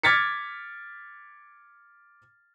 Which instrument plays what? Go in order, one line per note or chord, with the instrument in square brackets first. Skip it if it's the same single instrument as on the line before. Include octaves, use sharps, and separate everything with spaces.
[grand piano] D6 F6 G#6 A6 B6 C#7